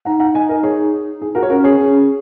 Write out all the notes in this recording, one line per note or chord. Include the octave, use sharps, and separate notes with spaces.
D#4 F#5 A#5
F#5 A#5
D#5 G#5
A#4 D#5
G#4 C#5
G#4
F#4 A#4
C#5
C#4 F#4 A#4
G#4 C#5
C#4